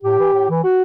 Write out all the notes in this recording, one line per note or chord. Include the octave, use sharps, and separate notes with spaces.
A2 G4
E3
A2
E3
F#4